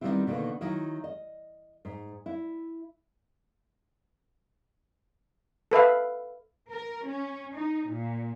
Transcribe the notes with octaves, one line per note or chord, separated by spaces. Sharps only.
D#3 F3 G3 B3 C4 E4
B2 D3 D#3 A#3 B3
D#3 F#3 E4
D#5
G#2
E4
A4 B4 E5 F5
A#4
C#4
D#4
A#2